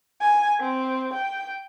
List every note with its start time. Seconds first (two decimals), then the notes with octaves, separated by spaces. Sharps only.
0.21 G#5
0.60 C4
1.13 G5